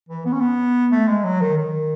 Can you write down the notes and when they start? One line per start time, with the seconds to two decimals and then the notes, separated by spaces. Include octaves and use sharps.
0.09 E3
0.26 B3
0.32 C#4
0.40 B3
0.92 A3
1.08 G#3
1.24 F#3
1.41 D#3
1.57 D#3